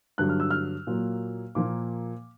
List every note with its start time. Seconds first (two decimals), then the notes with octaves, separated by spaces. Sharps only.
0.18 G2 D3 F#3 F#6
0.29 F6
0.40 E6
0.50 F6
0.87 A#2 F#3 A#3
1.55 A#2 F3 A#3 D6